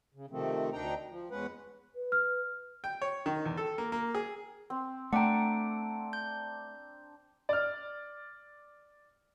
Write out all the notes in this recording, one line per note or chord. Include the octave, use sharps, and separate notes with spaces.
C#3
C3 D#3 F3 A3 C4
D2 D4 D#4 G5 A#5
F3
E2 G#3 C#4 B4 F#5
B4
F6
G5
C#5
D#3
E2
A4
A#3
A#3
G#4
C4
A3 D4 F#5 G5 A#5
G6
D5 F6